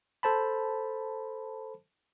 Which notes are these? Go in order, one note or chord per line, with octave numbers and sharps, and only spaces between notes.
A4 C5 A5 B5